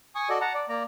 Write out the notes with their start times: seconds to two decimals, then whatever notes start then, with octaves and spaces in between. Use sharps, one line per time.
0.15 G#5 C#6 D#6
0.29 F#4 A4 D5 D#5
0.41 F#5 A5 A#5
0.54 D5
0.69 A#3 D5 A#5